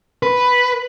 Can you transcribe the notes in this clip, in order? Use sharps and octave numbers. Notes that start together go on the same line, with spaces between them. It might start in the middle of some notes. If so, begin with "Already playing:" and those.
B4